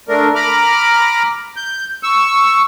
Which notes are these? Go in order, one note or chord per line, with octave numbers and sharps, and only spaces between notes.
A3 D4 A#4
A#5 B5 D6 F6
G6
C#6 E6